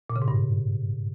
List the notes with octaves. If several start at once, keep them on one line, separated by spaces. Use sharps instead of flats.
A#2
C#3
G#2
G2